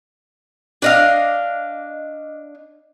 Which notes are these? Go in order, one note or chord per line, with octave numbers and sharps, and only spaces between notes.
D4 D#5 F5